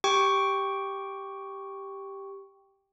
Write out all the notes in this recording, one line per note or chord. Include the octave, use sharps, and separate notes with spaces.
G4 G5 C#6